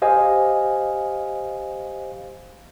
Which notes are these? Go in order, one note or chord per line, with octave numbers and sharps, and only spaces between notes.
G4 C5 D#5 F5 G#5